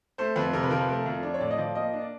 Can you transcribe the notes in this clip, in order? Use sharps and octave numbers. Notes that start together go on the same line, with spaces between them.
A3 C5
F2 B4
C3 A#4
B4
F3 A#4
B4
A3 A#4
F2
D4
C#5
A2 D5
D#5
F3 D5
A#3 D#5
D4
D5